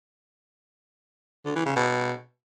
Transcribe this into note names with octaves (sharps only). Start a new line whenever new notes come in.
D3
E3
C#3
B2